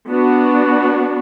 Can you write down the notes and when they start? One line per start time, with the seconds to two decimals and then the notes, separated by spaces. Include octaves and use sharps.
0.10 B3 D4 F#4